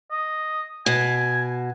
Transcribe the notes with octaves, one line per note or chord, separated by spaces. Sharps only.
D#5
B2 G#5